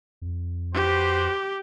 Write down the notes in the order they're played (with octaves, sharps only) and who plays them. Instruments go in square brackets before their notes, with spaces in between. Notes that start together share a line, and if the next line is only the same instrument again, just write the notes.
[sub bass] F2
[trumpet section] F#4 B4 C5 [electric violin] G4